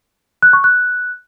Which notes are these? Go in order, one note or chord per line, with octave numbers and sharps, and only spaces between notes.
F#6
C#6
F#6